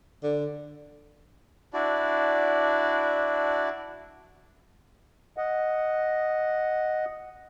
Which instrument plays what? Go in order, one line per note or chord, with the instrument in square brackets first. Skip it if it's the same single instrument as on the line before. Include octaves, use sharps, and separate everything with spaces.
[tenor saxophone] D3
[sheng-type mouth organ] D4 E4 F#4 D5
[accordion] D#5 F#5